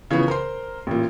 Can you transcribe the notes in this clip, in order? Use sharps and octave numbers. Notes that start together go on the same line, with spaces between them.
C#3 E3 F3 B3
A#4 C5 C6
A1 A#2